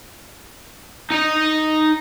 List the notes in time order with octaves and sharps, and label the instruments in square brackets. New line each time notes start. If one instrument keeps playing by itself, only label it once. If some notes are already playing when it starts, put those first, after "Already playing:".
[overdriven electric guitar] D#4 D#5